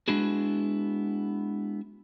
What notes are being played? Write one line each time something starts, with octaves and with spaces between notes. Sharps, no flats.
G#3 B3 D4 E4 F#4 G#4